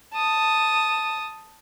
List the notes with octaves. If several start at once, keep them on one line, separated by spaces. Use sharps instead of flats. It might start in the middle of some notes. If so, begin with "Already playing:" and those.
A5 D#6